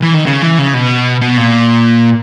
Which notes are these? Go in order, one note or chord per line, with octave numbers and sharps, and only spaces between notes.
E3
D#3
C#3
E3
C#3
B2
B2
A#2